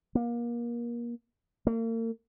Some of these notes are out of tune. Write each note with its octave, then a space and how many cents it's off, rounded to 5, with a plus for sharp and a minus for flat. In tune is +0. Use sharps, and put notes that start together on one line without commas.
A#3 +30
A#3 -40